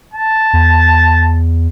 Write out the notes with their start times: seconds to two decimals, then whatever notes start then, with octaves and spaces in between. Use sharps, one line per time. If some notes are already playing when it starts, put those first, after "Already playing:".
0.14 A5
0.53 E2